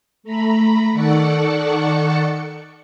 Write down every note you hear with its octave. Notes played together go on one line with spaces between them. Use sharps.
A3 A#5 B5
D#3 A4 D5 F#5 C#6 C#7